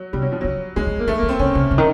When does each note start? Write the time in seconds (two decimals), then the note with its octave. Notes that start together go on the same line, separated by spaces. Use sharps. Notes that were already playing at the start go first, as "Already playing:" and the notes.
Already playing: F#3
0.13 C3 G3
0.22 F#3
0.32 F3
0.41 C#3 F#3
0.76 D3 G#3
0.87 D#3
0.97 E3 A#3
1.07 D#3 A3
1.18 D#3 A#3
1.29 C4
1.39 C#3 C#4
1.55 C#3
1.71 C#3
1.78 D#3